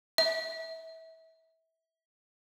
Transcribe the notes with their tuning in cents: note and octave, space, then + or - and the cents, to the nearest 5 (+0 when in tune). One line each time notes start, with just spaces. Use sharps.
E5 -25